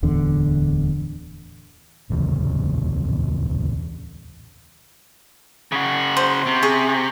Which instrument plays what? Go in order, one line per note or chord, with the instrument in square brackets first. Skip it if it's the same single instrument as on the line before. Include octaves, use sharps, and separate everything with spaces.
[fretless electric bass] D1 E2 D3
[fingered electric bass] D1 A#1 E2 C#3
[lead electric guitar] C#3 F#4
[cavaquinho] C5
[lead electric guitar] C3
[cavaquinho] G#4 C#6